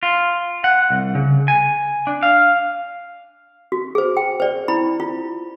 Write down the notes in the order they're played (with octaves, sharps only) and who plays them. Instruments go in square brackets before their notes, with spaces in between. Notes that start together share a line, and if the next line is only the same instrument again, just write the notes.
[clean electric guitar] F4
F#5
C2
C#3
G#5
D4
F5
[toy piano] F#4
G#4 C5
G5
C5 D5
E4 B5
F4